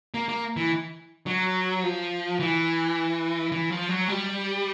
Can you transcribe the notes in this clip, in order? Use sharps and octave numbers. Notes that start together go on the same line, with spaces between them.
A#3
A#3
E3
F#3
F3
E3
E3
F3
F#3
G3